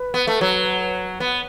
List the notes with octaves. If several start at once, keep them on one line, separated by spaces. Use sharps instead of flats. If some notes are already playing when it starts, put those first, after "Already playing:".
Already playing: B4
B3
A3
F#3
B3